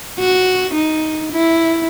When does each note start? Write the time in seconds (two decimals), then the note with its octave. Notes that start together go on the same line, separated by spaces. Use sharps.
0.20 F#4
0.74 D#4
1.32 E4